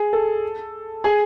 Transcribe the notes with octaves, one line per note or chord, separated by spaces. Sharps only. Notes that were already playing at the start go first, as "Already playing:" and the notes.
Already playing: G#4
A4
G#4